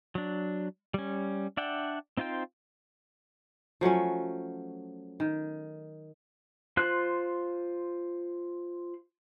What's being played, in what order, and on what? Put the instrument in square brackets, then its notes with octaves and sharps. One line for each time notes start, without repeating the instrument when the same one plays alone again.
[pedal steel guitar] F#3 D4
G3 C#4
D4 D5 E5 F#5 G5
C4 D#4 F4 C5 G5
[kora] F3 F#3 A3 C#4
D#3
[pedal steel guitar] F4 C5 F#6